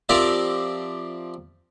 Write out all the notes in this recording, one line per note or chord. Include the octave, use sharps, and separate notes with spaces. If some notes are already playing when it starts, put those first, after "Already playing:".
F3 C4 G4 A#4 D5 E5